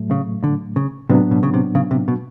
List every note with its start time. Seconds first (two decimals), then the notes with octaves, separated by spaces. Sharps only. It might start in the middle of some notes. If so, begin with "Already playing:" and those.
Already playing: A2 F#3 A3
0.11 C#3
0.44 D3
0.76 C#3
1.09 A2 C3 F#3 B3 D4
1.31 B2
1.43 C#3
1.54 C3
1.75 C#3
1.91 C3
2.08 B2